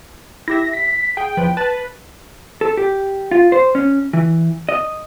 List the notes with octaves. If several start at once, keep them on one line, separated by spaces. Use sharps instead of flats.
E4 G4 E5 A#6
B6
G#4 G5
E2 F3 B4
B4 A5 A6
A4
G4
F4
C5
C#4
E3
D#5